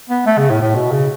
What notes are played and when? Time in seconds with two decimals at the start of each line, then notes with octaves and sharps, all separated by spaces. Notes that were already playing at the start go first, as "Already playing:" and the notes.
0.10 B3
0.26 A3
0.38 C#3
0.50 A2
0.62 A2
0.75 B2
0.91 C#3